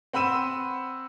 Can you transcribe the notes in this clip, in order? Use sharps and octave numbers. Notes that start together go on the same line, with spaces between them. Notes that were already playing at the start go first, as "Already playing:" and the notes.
C4 F#5 B5 E6 D#7 E7